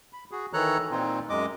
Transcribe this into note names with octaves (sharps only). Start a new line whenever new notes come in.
B5
F#4 G#4
D#3 E3 A4 C#5 A#5 F#6
A#2 C4 D#4 F4
F#2 G#3 D#5 D6